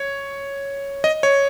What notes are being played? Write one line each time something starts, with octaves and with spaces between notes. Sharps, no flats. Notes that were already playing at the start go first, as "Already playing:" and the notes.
Already playing: C#5
D#5
C#5